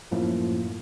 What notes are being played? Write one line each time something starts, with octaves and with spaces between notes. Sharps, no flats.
F#2 A2 F3 A#3